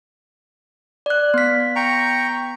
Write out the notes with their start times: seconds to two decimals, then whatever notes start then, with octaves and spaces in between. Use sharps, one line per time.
1.06 D5 F#6
1.34 B3 B6
1.76 G5 A#5 C#6